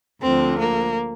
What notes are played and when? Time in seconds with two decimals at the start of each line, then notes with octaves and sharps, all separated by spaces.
0.21 D2 D3 F3 C4
0.60 A#3